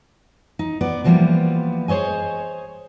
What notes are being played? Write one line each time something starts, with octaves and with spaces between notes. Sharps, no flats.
D#4
B3 D5
D3 E3 F3 G3 A#3 B3
G#4 C5 C#5 D#5 G#5